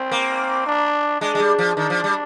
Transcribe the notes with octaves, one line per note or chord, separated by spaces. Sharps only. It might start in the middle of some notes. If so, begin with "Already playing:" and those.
Already playing: C4
A#3
D4
G#3 D4
G#3
G3
F3
D#3 D4
F3
G3